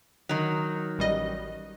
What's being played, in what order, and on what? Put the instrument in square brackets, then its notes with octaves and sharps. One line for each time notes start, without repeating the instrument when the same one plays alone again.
[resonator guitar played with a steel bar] D#3 F#3
[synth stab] A1 G3 D#5